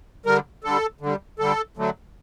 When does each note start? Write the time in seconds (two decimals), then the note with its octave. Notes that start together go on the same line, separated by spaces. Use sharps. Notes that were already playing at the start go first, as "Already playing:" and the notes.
0.26 D3 G3 A#4
0.64 D3 G3 A4
1.01 D3
1.06 G3
1.39 D3 G3 A4
1.77 D3 F#3 A3